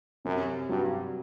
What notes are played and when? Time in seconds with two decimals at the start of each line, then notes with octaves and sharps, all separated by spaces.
0.25 F#2 C3
0.69 G2 F#3